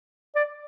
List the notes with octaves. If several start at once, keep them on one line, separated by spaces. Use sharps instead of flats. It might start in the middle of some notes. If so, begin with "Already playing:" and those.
D5